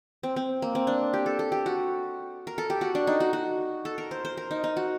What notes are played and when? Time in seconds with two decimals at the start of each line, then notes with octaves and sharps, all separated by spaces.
0.23 C4
0.36 C4
0.62 A#3
0.75 C4
0.87 D4
1.14 G4
1.26 A4
1.39 A4
1.52 G4
1.66 F#4
2.47 A#4
2.58 A4
2.70 G4
2.81 F#4
2.95 D4
3.07 D#4
3.20 F#4
3.33 F#4
3.85 A4
3.98 A#4
4.11 C5
4.25 C5
4.37 A#4
4.51 D#4
4.64 D#4
4.77 F#4